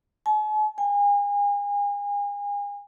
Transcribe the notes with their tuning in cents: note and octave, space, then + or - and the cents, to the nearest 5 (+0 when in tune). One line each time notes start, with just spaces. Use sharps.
G#5 +45
G#5 -35